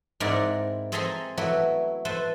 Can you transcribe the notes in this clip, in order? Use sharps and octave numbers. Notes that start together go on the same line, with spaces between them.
G#2 C4 E4 A#4 D5 F#5
C4 G#4 A4 E5 A#5 C6
F#3 A3 B3 E4
A4 B4 C5 E5